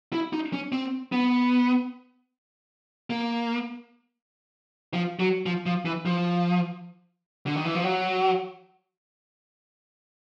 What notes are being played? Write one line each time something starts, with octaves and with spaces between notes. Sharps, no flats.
E4
D#4
C#4
C4
B3
A#3
F3
F#3
F3
F3
E3
F3
D3
D#3
E3
F3
F#3